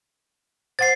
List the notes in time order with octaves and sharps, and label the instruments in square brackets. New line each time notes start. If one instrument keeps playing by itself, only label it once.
[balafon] C5 F#5 [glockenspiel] A6 C7